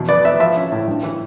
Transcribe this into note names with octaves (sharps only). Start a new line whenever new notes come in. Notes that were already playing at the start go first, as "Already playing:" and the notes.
Already playing: E2 B2
B3 D5
B3 E5
F3 E5
C#4
A2
G2
E3